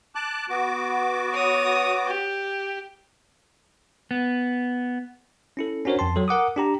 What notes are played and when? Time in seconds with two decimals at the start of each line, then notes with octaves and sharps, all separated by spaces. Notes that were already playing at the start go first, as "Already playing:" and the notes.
0.15 A5 D6 F#6
0.49 B3 F#4 D6
1.33 C#5 D#6
2.07 G4
4.11 B3
5.57 C#4 E4 A4
5.85 C#4 D4 F#4 A#4 C5 C#5
5.99 F2 G5 A5 C6
6.16 F#3 A4
6.28 A#4 F#5 D6 D#6
6.56 D4 G4 A#5